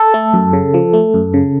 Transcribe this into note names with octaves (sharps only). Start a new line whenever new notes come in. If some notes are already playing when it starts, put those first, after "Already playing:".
Already playing: A4
A3
F#2
C#3
F3
A3
F#2
C#3